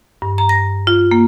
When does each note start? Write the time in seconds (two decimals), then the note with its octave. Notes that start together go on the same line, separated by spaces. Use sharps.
0.22 G2
0.38 A#5
0.49 A#6
0.87 F4
1.11 A#3